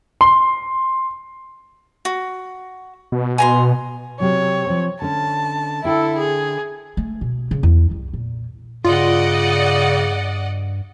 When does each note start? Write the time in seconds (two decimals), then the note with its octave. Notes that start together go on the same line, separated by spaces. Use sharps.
0.21 C6
2.05 F#4
3.12 B2
3.38 G#5 A#5 C6
4.20 C3 F#3 C#5
4.66 F3 C4
5.02 D3 C#4 A5
5.84 D3 E4 A4 G5 A5
6.18 G#4
6.97 A3
7.21 B2
7.51 C#3
7.63 E2
7.91 C2
8.13 A#2
8.85 G2 C#3 F4 D5 D#5 F#5